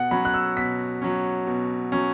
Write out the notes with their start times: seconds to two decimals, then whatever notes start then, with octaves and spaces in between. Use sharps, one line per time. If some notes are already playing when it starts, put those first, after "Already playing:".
Already playing: B2 F#5
0.11 F#3 C#4 B5
0.25 F#6
0.34 E6
0.57 B2 B6
1.02 F#3 C#4
1.47 B2
1.92 F#3 C#4